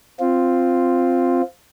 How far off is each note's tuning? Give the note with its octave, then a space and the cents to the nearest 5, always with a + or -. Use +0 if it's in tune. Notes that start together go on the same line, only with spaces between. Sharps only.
C4 +0 F4 +0